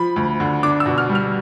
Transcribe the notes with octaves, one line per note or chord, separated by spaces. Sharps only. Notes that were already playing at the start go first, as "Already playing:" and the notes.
Already playing: F3 B5
D2
D3
D4 D6
E6
B2
F6
G3
F6